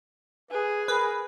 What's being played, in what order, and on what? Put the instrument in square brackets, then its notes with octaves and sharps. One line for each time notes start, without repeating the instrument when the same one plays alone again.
[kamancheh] G#4 [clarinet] B4
[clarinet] A#4 [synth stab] B4